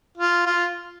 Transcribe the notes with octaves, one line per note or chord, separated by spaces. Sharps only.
F4
F4